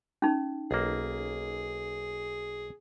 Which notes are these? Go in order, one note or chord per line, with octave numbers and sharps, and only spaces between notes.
C#4 D#4
B1 A#3 G#4